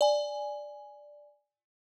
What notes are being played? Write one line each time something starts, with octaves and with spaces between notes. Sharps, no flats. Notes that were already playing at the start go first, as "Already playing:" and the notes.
D5 G#5